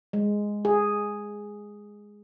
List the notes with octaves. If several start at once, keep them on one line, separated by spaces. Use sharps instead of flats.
G#3
G#4